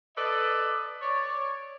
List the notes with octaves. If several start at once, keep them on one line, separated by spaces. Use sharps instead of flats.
A4 B4 D5 D#5
C#5 D5